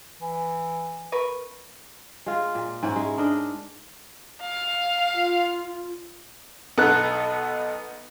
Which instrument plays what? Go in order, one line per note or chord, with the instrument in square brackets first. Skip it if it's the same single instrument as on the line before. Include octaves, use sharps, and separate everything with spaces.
[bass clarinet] E3
[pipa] A#4 B4 C#6
[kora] G#3 F4
A#2
G#2 C#4 E4
G#3
D4 A#4 D#5
[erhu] F5
[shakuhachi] F4
[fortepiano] B1 A4 F#6 [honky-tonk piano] B3 D#4